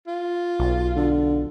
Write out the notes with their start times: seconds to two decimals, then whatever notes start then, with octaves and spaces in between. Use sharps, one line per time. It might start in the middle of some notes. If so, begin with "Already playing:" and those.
0.07 F4
0.60 B1
0.96 D3